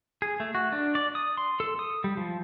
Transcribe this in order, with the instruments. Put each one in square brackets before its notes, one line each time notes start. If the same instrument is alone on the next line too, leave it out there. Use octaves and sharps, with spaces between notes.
[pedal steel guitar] G#4
A3
F#4
D4
D5
D#6
C6
A4
D#6
G3
F3